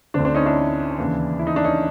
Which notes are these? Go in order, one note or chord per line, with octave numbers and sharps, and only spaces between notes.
D2 D3 C4 D4
C4 D4
C#4 D#4
D4 E4
D#2 C#3 E3
E4
D#4
D4
C#4 D#4